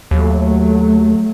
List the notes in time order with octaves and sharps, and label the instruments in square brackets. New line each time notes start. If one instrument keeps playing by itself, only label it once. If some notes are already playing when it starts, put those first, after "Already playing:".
[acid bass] D#2 [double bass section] F#3 A3